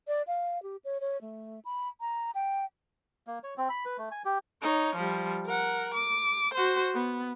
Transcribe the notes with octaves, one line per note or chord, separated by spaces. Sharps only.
D5
F5
G4
C#5
C#5
A3
B5
A#5
G5
A#3
C#5
C4
B5
B4
A3
G#5
G4
D#4 C#5
F3 G3
A#4 F#5
D6
F#4 C5
B3